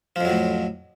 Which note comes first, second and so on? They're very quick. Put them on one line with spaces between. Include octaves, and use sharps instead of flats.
F3 F2 F#3 A2